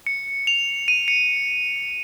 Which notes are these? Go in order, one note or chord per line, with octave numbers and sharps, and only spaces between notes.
C#7
F7
D#7
C#7